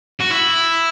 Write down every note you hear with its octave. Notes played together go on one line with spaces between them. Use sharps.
F#4
E4